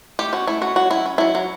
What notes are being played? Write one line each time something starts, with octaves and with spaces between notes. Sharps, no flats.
A3 G4
C#4 F#4
A3 E4
C#4 F#4
F#3 F#4
C#4 E4
C#4
F#3 E4
F#3